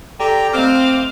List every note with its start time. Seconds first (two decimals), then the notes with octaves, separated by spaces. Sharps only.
0.20 G4 A4 D5 G5 A#5 C6
0.53 A3 C4 C5 D#5 F5 D6 F6